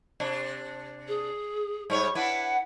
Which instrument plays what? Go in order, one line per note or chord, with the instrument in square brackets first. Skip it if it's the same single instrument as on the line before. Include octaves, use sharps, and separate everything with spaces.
[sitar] C3 D4
[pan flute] G#4
[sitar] G#2 G3 C#5 [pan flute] C#6
[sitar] D4 E4 B4 [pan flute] F#5